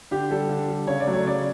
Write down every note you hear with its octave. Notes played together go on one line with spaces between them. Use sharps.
D3 G4
G3 A4
D3
G3
C#3 C#5
D5
F#3 A3
C#5
C#3 D5